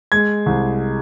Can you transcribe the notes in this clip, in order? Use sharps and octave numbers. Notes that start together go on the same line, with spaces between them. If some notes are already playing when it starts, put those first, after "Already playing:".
G#3 G#6
C2